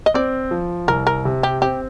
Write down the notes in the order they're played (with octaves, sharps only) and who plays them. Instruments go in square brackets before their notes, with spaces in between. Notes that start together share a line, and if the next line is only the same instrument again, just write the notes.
[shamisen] D#5
[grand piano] C4 [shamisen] D5
[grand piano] F3
[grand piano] C2 [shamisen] A#4
[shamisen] A#4
[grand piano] C3
[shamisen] G4
[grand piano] C4 [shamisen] G4